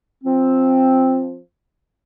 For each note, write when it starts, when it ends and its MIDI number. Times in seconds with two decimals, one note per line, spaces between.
0.24 1.37 53
0.24 1.37 60